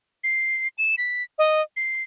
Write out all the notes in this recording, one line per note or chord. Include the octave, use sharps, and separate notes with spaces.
C7
E7
B6
D#5
C7